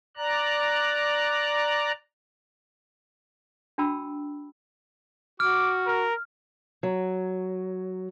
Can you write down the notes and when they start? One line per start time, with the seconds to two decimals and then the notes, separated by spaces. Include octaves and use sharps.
0.17 D5 A#5 F#6
3.78 D4 F#4 G5 A5 B5 E6
5.40 F#4 D6 F6
5.87 A#4
6.83 F#3